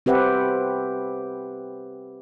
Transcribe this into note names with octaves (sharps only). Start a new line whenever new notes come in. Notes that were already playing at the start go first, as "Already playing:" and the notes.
C4 G4 B4 E5 F#5